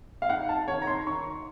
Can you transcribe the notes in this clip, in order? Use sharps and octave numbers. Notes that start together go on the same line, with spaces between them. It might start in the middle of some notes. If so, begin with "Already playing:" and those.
F5
D#4 F#5
A5
D#3 C#5
A#5
C6
D#3 C#6